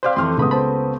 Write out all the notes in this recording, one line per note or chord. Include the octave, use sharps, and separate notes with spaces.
C4 G4 B4 C5 D5 F5
F2 E3 A3 C4 D#5 C6 F6
C#2 A2 B3 B5 D#6
C5 A5 B5